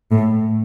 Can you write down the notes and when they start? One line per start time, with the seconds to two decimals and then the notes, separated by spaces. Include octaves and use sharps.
0.11 A2